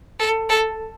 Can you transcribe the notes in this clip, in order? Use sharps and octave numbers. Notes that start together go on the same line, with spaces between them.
A4
A4